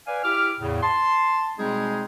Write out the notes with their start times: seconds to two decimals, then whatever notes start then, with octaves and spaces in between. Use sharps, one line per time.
0.07 B4 D5 F5 G#5
0.23 E4 G4 D6 F6
0.60 E2 A2 C#3
0.82 A5 C6
1.59 B2 G3 G#3 C4 D#4 G#4